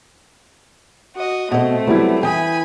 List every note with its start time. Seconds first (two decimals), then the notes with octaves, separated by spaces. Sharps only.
1.16 F#4 D#5
1.52 B2 A3 C4 D#5
1.87 F#3 G3 B3 E4
2.23 E3 G5 G#5 B5 D#6